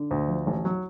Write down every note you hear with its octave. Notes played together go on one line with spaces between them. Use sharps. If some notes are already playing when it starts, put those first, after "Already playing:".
Already playing: D3
D2
F3
A1
F#3